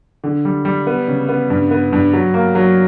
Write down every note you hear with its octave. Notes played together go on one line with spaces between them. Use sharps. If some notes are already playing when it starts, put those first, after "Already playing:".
D3
G3
G3
B3
C#3
B3
G2
B3
G2
F#3
A#3
F#3